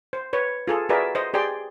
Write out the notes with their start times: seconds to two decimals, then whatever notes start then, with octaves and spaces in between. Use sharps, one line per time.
0.13 C5
0.33 B4 C#5
0.68 F4 G#4 A4
0.89 F#4 G#4 A#4 B4 D5 E5
1.15 C5 D#5
1.34 G4 G#4 D5 G5 C6